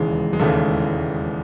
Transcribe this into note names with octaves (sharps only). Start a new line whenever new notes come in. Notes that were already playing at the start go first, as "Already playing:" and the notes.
Already playing: E1 D#2 C#3 E3 G#3
G#3
E1 D#2 C#3 E3 A3